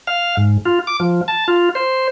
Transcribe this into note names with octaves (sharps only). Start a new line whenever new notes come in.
F5
G#2
F4
D6
F3
A5
F4
C5